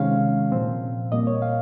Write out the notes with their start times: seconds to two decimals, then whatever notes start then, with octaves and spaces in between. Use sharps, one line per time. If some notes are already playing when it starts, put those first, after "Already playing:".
Already playing: C3 D#3 G#3 C#4 F5
0.52 A#2 F3 C4
1.12 A#2 G3 A#3 D#5
1.27 C#5
1.42 F5